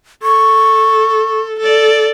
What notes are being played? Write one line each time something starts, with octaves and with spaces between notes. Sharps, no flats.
A4 C#6
A4 D5